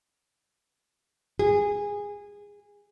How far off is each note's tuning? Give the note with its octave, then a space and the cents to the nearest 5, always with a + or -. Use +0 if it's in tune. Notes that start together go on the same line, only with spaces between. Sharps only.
G#4 -20